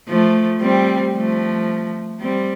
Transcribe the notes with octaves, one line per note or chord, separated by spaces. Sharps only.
F3 A3
G3 C4
F3 A3
G3 C4